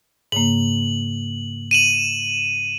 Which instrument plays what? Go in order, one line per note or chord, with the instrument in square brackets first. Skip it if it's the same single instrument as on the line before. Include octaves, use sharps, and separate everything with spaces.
[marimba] G#2 C#3 A#3 [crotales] F#7
[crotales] D#7 E7 F#7